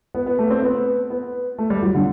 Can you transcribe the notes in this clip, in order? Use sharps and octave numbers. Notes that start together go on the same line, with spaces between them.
B3
B3
A3
C4
B3
B3
A3
G3
F#3
D3